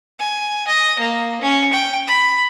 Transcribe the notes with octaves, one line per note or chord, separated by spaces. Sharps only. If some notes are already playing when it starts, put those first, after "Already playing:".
G#5
D#5
A#3
C#4
G5
B5